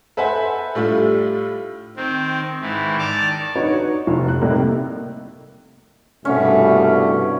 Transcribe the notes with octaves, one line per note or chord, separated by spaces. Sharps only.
A4 B4 C5 E5 F#5 G#5
A2 G3 A3 D4 F4
D#3 C4
G#2 D#3 E3
D#3 D5 A5 D6 F6
D4 D#4 F#4 B4 C#5
F1
F#6
A2 C3 G3 A#3 D#4 E4
C2 G2 B2 D3 A3 C#4